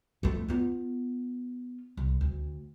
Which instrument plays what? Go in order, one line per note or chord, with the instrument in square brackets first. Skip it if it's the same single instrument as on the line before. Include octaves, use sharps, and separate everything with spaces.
[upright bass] F2 A3
B3 F4
C2
D2